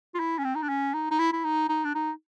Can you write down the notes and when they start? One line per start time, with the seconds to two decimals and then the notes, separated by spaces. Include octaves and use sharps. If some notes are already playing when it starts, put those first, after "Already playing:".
0.14 F4
0.19 E4
0.38 C#4
0.44 C4
0.55 D#4
0.62 D4
0.69 C#4
0.94 D#4
1.11 D#4
1.19 E4
1.33 E4
1.44 D#4
1.69 D#4
1.84 D4
1.95 D#4